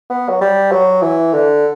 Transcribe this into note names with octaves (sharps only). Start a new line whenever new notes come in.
B3
F#3
G3
F#3
E3
D3